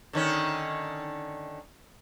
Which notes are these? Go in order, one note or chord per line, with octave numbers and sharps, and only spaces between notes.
D3 D#3 C#4